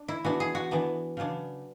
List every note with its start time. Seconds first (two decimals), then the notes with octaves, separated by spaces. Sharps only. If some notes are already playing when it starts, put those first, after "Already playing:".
Already playing: D4
0.08 E4
0.24 E3 B3 D4 F#4
0.40 G#4
0.55 F#4
0.71 E3 B3 D4
1.17 C#3 F#3 B3 D4